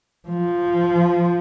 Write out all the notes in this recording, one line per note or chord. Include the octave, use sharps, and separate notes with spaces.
F3